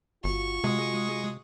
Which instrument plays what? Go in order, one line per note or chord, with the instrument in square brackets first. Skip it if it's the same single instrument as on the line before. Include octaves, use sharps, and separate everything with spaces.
[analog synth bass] G1 [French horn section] F4 F#4 [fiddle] C#6
[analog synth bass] C3 [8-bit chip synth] G#3 D#6